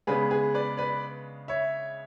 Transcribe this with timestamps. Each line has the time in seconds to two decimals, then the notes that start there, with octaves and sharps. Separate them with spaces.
0.07 C#3 G#3 B3 D4 G#4 B4
0.30 G#4 B4
0.54 B4 D5
0.77 B4 D5
1.48 C#5 E5